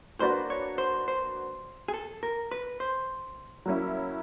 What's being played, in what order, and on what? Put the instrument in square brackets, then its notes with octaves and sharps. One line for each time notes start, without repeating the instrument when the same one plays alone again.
[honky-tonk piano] A#3 D4 F#4 B4 D5 [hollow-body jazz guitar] C5
[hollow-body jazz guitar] C#5
C5
C5
G#4
A4
A#4
B4
C5
[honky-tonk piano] F#3 A#3 C#4 E4